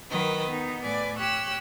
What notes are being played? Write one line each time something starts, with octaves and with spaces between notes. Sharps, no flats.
D#3 F#3 A#4 B4 D#5
B3 D#4
A2 B4 D5 G#5
G4 C#5 E6 F#6